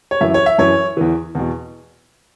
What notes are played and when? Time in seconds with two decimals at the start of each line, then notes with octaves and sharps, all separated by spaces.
0.11 C#5
0.21 F#2 E3 E5
0.34 C#5
0.46 E5
0.58 F#2 E3 C#5
0.97 E2 E3
1.35 E2 B2